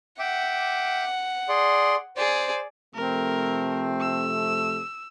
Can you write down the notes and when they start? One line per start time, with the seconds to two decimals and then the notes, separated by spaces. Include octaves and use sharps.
0.19 E5 F#5 G5 D6
1.49 G#4 D5 C6
2.17 G#4 C5 D5
2.95 C3 F3 A3 C4 A#4
4.01 E6